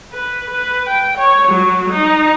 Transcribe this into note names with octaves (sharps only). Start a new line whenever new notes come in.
B4
B4
G5
C#5
F#3
D#4